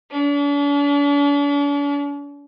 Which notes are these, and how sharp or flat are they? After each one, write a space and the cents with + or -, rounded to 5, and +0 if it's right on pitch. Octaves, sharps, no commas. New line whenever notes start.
D4 -45